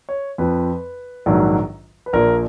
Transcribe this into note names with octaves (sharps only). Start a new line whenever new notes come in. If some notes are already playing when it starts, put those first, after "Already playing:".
C#5
F2 F3 B4
A#1 G#2 D#3 F#3
B4
A#1 A#2 F3 A#4